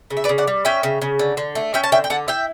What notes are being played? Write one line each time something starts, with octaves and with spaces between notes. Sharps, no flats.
C#3
E5
B4 D5
C#3
D5 F#5
G3
C#4 E5 G5
C#3
C#3
D3
D3
A3
C#4 E5 G5
A5
D3 E5 G5
G5
D3 F#5 A5
E4 E5 G5